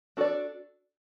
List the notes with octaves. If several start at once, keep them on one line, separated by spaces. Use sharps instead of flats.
D4 F#4 A4 D5